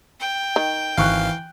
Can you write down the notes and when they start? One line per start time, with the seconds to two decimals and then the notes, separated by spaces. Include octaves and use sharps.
0.20 G5
0.56 D#3
0.97 G#1 E3 F5 C#6 F#6